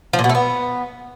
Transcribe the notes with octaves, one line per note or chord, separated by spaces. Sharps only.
F3
A#2
B2
A3
B3